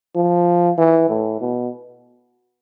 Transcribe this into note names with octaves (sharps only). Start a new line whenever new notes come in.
F3
E3
A2
B2